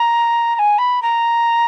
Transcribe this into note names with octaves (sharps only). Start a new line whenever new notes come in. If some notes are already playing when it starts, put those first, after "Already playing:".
Already playing: A#5
A#5
G#5
B5
A#5